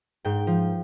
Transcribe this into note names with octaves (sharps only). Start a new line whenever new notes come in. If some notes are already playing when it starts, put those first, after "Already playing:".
G#2 G5
F3